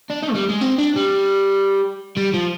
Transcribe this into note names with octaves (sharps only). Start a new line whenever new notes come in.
D4
D#4
G#3
G3
G#3
C4
D4
G3
G3
F3